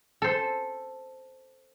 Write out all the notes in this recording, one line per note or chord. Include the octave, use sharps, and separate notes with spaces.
A4 C5